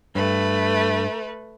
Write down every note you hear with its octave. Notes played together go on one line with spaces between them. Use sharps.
G2 A3 B4